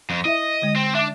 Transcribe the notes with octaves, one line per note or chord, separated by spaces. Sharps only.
F2
E4 D#5 E5
D3 G#3
C4
D4 E5 D6